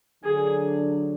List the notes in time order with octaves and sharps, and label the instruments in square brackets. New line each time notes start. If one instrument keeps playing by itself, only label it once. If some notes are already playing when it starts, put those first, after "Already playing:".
[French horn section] D3 F#3 D4 [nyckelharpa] G#4